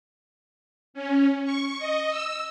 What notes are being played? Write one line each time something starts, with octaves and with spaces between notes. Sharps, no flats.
C#4
C#6
D#5
E6